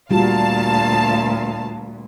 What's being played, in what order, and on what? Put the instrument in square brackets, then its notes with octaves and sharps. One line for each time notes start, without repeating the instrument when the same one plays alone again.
[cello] D2 A#2 [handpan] G3 F4 F#4 [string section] F5 A5